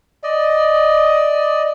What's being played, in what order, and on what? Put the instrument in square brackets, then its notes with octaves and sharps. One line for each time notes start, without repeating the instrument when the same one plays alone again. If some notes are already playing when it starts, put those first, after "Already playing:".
[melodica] D5 D#5